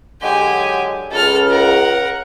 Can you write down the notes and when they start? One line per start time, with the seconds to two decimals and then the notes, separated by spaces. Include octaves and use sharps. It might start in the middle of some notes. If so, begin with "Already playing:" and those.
0.22 D3 F#3 G#3 G4 G#5
1.11 C#2 A4 F6
1.50 A#4 F#5